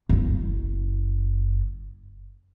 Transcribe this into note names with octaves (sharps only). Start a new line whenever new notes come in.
F#1 E4